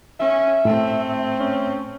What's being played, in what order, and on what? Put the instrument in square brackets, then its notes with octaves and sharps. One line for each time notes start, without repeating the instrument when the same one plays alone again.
[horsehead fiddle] C#4 [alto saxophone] E5
[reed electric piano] A2 [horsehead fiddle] A3 C4
[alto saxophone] C#4